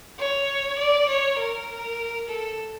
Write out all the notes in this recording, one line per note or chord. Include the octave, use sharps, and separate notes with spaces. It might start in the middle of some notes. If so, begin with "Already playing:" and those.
C#5
D5
C#5
A#4
A4